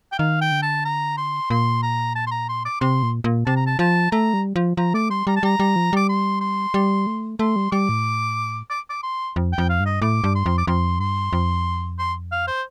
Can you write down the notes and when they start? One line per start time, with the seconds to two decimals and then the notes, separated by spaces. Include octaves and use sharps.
0.12 G5
0.19 D#3 F5
0.41 G5
0.51 D3
0.62 A5
0.85 A#5
1.17 C6
1.50 A#2 C6
1.82 A#5
2.15 A5
2.27 C6
2.31 A#5
2.49 C6
2.65 D6
2.81 C3 C6
3.03 A#2
3.24 A#2
3.46 C3 A5
3.56 A#5
3.66 A5
3.79 F3 A5
4.12 A3 A#5
4.34 G3
4.56 F3
4.77 F3 A#5
4.94 A3 D6
5.10 G3 C6
5.27 G3 A#5
5.36 A5
5.43 G3 A#5
5.60 G3
5.76 F3
5.93 G3 D6
6.09 C6
6.41 C6
6.74 G3
7.07 A3
7.39 A3 C6
7.56 G3
7.72 G3 D6
7.89 A2
8.70 D6
8.90 D6
9.03 C6
9.36 F2
9.53 G5
9.58 F2
9.69 F5
9.80 G2
9.86 D#5
10.02 A2 D6
10.24 G2
10.35 C6
10.46 F2
10.58 D6
10.67 F2 C6
11.00 G2 C6
11.33 F2
11.99 C6
12.32 F5
12.47 C5